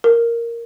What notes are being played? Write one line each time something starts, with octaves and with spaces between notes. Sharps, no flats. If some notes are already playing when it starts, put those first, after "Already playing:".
A#4